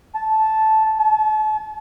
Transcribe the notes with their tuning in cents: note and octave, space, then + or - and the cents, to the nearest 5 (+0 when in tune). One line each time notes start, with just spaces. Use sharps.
A5 -10
A5 -40